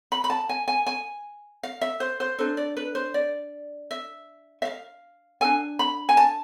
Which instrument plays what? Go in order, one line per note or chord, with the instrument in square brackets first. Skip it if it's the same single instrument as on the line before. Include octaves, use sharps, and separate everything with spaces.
[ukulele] B5
B5
A5
G#5
G#5
G#5
F5
E5
C5
C5
D4 A4 C5
D5
B4
C5
D5
E5
E5
F5
A4 G#5
D4
B5
G#5
A5